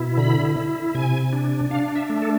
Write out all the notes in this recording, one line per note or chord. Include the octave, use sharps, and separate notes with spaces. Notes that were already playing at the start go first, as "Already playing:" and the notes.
Already playing: B2 E4
D3 B5
E4
C3 G#5
D4
D4 F5
E5
A3
A4